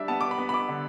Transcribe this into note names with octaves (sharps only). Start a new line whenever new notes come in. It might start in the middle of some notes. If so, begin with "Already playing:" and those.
Already playing: G3 D4 D5 E5
B3 A5
D6
B5
B3
B5
D6
D3